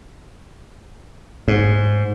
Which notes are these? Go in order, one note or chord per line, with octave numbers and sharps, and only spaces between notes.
G#2